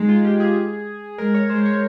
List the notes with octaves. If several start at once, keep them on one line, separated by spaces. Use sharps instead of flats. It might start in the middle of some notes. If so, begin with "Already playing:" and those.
Already playing: G#3 D#4
F4
G4
G#4
G#3 A#4
C#5
G#3 C5
C#5